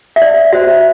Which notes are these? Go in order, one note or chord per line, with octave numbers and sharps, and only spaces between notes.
E5
D5
F#4 C5 E5